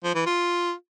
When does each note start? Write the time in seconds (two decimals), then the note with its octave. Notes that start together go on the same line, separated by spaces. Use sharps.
0.04 F3
0.15 E3
0.26 F4